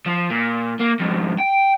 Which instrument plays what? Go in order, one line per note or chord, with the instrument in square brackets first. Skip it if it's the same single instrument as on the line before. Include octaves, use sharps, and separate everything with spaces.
[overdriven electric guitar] F3
A#2
A#3
F2 G#2
G5